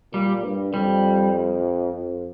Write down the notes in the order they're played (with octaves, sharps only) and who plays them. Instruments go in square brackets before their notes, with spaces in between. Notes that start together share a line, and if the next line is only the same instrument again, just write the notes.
[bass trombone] A#2 [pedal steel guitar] G3
[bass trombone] G2
[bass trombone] F2 [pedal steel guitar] G3
[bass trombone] F2